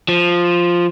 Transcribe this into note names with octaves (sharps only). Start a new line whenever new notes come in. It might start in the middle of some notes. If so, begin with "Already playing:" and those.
F3